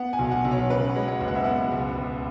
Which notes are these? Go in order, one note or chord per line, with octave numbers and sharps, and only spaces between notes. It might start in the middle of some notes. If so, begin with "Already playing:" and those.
Already playing: B3 F#5
G#5
B1
F#5
B1
C#5
C#3 B4
F#5
G#3
F#5
F#1
F#5
E5
B3 F#5
C#2
C#2